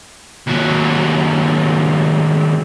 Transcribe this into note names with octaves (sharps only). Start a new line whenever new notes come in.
D#2 F#3